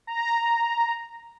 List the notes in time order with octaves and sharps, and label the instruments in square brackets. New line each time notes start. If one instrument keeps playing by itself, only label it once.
[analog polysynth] A#5